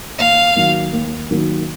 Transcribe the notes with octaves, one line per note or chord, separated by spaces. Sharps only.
D#2 F5
D#3 F#3 A#3
D#2
D#3 F#3 A#3